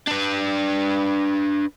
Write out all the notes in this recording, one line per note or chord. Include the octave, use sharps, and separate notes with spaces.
D4 B4